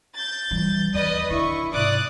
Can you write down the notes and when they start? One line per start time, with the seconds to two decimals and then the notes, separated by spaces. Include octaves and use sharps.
0.15 G6 A6
0.51 E3 G3
0.94 D#2 B4 D5 D#5 D#6
1.30 D3 E4 C#6
1.73 G#2 C3 D5 D6 D#6 F#6